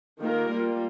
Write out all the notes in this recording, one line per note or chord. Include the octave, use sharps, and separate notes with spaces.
D#3 A#3 F4 A#4
G3 A#3 F4